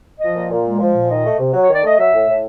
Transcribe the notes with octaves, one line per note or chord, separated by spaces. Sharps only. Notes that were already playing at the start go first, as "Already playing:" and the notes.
F3 D#5
A#2
A#2
G#3
F3
A#2
D#3 D#5
A3
C3
F#3
C#5
D#3 D5
A3 D#5
F#3 E5
A2
A2